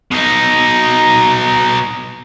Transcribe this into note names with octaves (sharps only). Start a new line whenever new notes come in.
B2 D#4